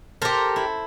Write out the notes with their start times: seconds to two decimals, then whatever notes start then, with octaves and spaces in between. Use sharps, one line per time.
0.22 G4 A4 A#4 C5
0.56 E4